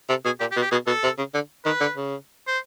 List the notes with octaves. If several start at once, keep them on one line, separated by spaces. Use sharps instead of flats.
C3 A4
B2 G#4
A#2 G4
G4
B2
G4
B2 G#4
B2 A4
C3
C#3
D3
D#3 B4
D3
C#3
C5